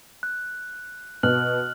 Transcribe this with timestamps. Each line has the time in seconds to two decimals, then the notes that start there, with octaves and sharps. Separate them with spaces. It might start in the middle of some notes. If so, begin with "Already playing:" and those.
0.23 F#6
1.23 B2 F6 F#6 F#7